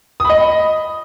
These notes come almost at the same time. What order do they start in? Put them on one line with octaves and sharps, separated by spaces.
D#6 B5 D#5